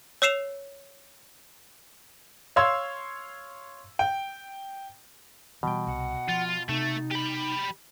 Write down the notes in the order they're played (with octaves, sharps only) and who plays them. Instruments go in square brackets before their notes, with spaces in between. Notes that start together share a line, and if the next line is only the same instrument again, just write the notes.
[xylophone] C#5 E6 C7 E7 F7
[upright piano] C#5 F5 C6 E6 G#6
G5
[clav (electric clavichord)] B2 G5 [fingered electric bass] E3 G3
[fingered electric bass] C2 [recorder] F#5
[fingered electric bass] F3 [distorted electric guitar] F4
[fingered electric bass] C3 [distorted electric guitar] A3 [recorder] D#4
[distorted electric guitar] G4 B5